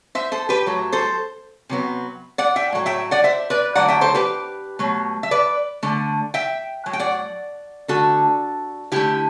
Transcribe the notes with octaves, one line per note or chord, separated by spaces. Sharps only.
C5 E5
A4 C5
G4 B4
A2 F#3 A3
A4 C5
C3 F#3 B3
D5 F#5
E5 G5
A2 F#3 A3
E5 G5
D5 F#5
C5 E5
B4 D5
D3 F#3 A3 D5 F#5
E5 G5
A4 C5
G4 B4
B2 F#3 A3
E5
B4 D5
D3 A3
E5 G5
A2 F#3
G5
D5 F#5
D3 A3 F#4 A4
D3 A3 E4 G4